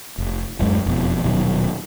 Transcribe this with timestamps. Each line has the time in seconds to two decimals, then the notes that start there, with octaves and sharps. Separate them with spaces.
0.18 F1
0.59 D1 F#2 G#3
0.86 E1 F2 B2
1.23 D#1 B2 D#3 F#3